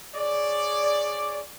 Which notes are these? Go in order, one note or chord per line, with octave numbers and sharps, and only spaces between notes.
G#4 C#5 D5